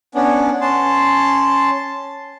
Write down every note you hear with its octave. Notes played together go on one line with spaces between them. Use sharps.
B3 C#4 D4
C#4 A5 C6